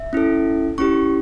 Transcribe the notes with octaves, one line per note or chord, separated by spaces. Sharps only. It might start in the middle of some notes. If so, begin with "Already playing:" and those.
Already playing: E5
C#4 E4 A4
C#4 E4 G4 C#6